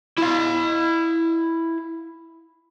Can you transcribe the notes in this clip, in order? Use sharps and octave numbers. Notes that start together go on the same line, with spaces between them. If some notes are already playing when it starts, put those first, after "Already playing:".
E4 F5